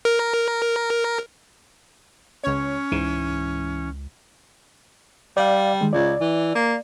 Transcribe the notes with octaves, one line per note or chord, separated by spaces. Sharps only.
A#4
C#2 C#4 C#5
C#2 G#2 E3
G3 D5 F5
D#3 G#3
C#2 D5
E3
A#3